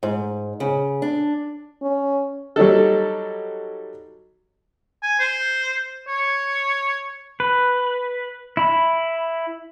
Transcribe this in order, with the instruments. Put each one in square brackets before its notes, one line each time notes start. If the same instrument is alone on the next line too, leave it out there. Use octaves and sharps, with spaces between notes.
[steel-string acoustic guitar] G#2
C#3
D4
[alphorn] C#4
[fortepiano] F#3 G3 D#4 A4
[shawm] G#5
C5
C#5
[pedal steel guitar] B4
E4 B5